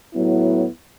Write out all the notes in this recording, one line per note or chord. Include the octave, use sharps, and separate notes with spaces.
A2 F#3 B3 E4